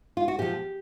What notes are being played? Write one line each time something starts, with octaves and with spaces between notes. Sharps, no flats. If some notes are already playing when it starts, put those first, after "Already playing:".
F4
F#4
A#2 F3 G4